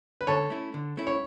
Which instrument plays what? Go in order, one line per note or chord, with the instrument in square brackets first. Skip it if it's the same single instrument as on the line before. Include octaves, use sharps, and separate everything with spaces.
[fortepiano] B4
[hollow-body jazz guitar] D3 [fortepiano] A4 C#5
[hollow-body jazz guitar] A3 C#4 E4
D3
A3 C#4 E4
[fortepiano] C#5